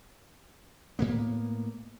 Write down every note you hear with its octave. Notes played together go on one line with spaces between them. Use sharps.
A2 A#3 B3